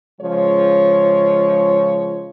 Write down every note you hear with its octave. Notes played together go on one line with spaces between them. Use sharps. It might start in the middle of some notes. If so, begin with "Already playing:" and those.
C#3 F3 G#3 C#5